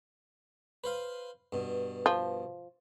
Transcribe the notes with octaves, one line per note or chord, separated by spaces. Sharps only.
B4 C5 F5
G2 B2
F3